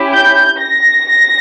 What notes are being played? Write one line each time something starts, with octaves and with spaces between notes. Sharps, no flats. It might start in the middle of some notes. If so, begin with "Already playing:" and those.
Already playing: C#4 E4 G4
G6
A#6